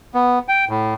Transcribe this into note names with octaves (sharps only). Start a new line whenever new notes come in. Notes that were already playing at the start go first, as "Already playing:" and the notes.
B3
G5
A2